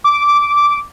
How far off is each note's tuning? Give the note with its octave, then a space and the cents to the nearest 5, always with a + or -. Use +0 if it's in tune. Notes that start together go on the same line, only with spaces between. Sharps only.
D6 -10